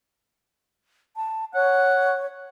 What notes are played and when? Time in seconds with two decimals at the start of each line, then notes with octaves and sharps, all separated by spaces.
1.16 A5
1.54 C#5 F#5